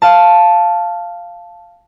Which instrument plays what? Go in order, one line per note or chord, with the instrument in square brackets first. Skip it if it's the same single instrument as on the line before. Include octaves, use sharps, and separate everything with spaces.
[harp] F5 A5